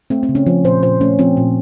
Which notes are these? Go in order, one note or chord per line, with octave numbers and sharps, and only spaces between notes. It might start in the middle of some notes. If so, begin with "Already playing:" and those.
A3 C4
C4
C#3
C#4
F3
A#2 C5
A#2 C5
A3 C#4
F3 C4
A#2